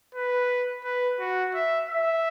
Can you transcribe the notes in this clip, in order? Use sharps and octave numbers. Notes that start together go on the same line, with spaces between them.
B4
B4
F#4
E5
E5